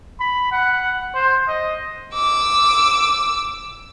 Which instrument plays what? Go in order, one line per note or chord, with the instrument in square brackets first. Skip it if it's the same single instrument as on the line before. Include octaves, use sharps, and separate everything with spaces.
[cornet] B5
F#5
C5
D#5
[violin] D6 E6